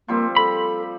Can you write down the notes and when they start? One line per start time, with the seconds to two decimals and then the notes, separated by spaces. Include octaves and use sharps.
0.08 F3 G3 A#3 C4
0.37 A4 B5